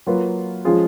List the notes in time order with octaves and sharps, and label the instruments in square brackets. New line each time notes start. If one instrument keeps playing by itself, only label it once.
[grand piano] F#3 A#3 F4 B4
F3 G#3 C#4 F4 G#4